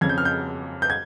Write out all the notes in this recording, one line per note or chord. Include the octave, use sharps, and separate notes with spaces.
F2 C#3 G#6
G6
F6
G6
G6
G#6